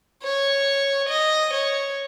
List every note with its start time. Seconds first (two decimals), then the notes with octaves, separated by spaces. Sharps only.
0.23 C#5
1.09 D#5
1.54 C#5